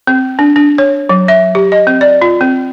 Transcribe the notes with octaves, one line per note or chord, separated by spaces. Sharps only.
C4
D4
D4
C#5
F#3
E5
G4
D#5
C4
D5
F4
C4